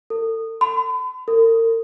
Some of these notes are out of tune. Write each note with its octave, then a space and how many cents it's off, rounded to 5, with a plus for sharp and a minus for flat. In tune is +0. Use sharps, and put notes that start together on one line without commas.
A4 +40
B5 +45
A#4 -40